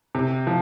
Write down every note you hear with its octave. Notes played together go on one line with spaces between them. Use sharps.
C3
F3